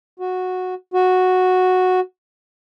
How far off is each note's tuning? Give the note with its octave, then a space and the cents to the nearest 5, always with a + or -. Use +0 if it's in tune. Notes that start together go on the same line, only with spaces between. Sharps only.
F#4 -10
F#4 -5